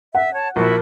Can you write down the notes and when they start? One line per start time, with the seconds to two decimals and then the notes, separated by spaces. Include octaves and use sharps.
0.15 E5 F#5
0.33 C#5 A5
0.56 A#1 F3 E4 F#4 A#4 E5